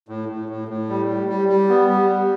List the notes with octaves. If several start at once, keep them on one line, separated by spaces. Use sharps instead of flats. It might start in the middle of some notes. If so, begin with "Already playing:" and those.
A2
A2
A2
A2
G3
G3
G3
G3
B3
G3
G3